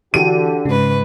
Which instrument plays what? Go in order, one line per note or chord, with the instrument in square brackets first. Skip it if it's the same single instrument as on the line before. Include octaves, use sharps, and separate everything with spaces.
[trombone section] D3 G4 [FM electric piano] E3 F#4 [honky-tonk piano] D#7
[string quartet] G#2 B4 [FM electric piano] C#3